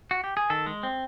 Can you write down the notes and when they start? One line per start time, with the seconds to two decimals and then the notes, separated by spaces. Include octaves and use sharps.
0.11 F#4
0.24 G4
0.37 G#4
0.50 D#3 A4
0.66 G#3
0.83 C4